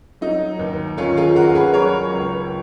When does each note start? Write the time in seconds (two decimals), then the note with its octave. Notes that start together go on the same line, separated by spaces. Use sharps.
0.21 F#3 D#4
0.59 D#2
0.97 D#3 C#4 F4
1.17 F4 G#4
1.36 D#2 F#4 A#4
1.55 G#4 B4
1.73 F#3 A#4 C#5
2.12 C#2